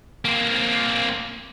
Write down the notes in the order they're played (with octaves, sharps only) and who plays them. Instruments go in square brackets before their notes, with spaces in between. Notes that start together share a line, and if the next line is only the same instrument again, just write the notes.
[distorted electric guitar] A#3 C4